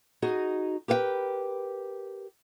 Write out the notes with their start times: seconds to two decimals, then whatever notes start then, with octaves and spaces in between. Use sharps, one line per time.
0.22 D#4 F#4 G#4 D#5
0.88 G4 A#4 B4 F5 G5